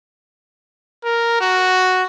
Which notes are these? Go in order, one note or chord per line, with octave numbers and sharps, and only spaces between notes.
A#4
F#4